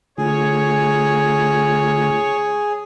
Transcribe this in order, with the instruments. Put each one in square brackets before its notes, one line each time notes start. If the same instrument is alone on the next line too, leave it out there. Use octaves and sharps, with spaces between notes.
[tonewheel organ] D3 A3 F4 [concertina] G#4 [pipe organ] C#5